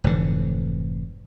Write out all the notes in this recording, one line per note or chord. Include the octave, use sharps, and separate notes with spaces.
F1 G#2 D3 E3